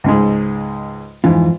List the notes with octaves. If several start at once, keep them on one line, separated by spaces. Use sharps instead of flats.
C#2 G#2 G#3
F2 G#2 E3 F4